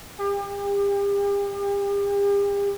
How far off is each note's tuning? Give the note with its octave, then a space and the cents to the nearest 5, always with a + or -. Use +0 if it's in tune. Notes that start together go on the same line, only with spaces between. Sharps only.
G4 +40